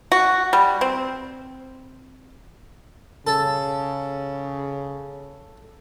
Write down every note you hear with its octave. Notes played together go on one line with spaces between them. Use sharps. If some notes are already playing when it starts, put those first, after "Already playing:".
F#4
G3
C4
C#3 A4